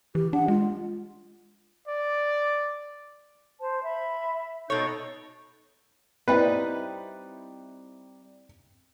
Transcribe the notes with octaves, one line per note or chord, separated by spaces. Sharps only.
E3 G4
D4 F#5
G#3 F4
D5
C5 A5
E5 B5
B2 D#4 A4 C#5 G6
G3 C4 D#4 E4 B4 G5